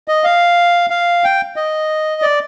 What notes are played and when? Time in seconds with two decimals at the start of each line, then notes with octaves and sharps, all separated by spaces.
0.08 D#5
0.24 F5
0.90 F5
1.24 G5
1.56 D#5
2.22 D5